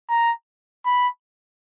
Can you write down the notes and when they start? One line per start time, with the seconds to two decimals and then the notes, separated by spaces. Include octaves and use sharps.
0.10 A#5
0.85 B5